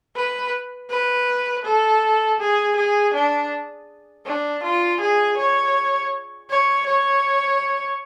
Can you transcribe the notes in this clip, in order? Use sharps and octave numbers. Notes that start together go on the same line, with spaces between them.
B4
B4
A4
G#4
G#4
D4
D4
F4
G#4
C#5
C#5
C#5